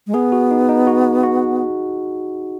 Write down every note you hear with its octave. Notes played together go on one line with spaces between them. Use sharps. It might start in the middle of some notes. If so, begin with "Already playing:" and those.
G#3
B3 G#4
F#4
D#4
D#4
F#4
F#4